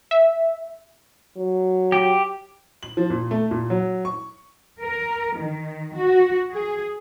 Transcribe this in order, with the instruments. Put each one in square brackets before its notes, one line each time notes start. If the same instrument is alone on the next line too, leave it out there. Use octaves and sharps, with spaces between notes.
[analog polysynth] E5
[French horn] F#3
[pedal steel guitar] G4
[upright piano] F#7
F3
A#2
A3
A#2
F#3
C#6
[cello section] A#4
D#3
F#4
G#4